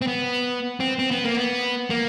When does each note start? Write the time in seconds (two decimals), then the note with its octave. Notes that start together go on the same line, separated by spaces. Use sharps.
0.02 C4
0.07 B3
0.80 C4
0.99 C4
1.11 B3
1.24 A#3
1.37 B3
1.90 A#3